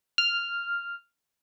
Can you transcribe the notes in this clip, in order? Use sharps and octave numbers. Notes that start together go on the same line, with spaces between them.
F6